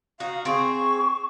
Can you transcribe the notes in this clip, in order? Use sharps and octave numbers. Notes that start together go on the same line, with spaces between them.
D#4 F#4 F5
C4 G#4 C#6